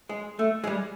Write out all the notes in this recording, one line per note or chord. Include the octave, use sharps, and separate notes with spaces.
G#3
A3
G#3
G3